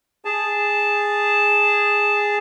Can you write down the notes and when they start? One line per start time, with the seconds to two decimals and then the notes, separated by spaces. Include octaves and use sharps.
0.25 G#4 A5